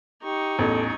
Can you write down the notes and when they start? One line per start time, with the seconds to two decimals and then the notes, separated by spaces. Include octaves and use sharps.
0.24 D#4 G4 C#6
0.59 A1 E2 A4